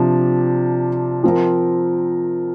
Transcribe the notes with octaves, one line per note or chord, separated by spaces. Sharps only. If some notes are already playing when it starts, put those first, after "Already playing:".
Already playing: C3 F3 D4
F3 C4 F4 A#4